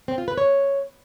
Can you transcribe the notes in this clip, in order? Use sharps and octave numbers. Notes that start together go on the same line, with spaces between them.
C4
F4
B4
C#5